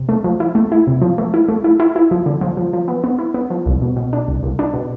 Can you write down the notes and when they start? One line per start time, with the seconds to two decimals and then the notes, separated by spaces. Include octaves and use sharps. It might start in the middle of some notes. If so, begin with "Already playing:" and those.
Already playing: C3
0.09 A3
0.24 F3
0.40 E4
0.55 A3
0.72 E4
0.87 C3
1.02 F3
1.18 A3
1.34 E4
1.49 A3
1.64 E4
1.80 E4
1.96 E4
2.11 F3
2.26 D3
2.41 F3
2.57 F3
2.73 F3
2.88 B3
3.04 B3
3.19 E4
3.34 B3
3.50 F3
3.66 C2
3.82 B2
3.96 B2
4.13 D4
4.28 C2
4.43 C2
4.59 D4
4.74 B2